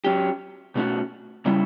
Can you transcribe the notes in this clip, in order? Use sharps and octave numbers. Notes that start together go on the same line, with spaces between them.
F#3 C#4 G4
B2 A3 C#4 F#4
C#3 G3 C#4 E4